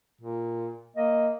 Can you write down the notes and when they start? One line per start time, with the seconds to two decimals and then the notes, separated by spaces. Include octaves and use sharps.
0.21 A#2
0.96 A#3 D#5